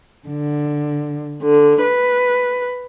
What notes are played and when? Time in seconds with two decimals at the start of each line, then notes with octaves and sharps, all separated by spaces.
0.28 D3
1.42 D3
1.83 B4